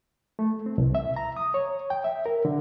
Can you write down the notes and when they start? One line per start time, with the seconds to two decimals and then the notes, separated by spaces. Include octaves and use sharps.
0.39 A3
0.66 C4
0.78 C2
0.95 E5
1.16 A#5
1.37 D#6
1.54 C#5
1.90 G5
2.04 E5
2.26 A#4
2.45 D3